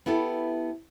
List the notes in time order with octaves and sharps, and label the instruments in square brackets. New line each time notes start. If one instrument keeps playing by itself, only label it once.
[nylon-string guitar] B3 E4 G4 A4